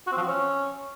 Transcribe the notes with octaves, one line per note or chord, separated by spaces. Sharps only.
F#4
C4
F3
C4
C#4